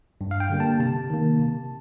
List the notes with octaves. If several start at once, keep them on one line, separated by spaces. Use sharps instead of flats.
G2
F5
G5
D3 G3 A#3
A5
C3 A5
D#3 A#3
C3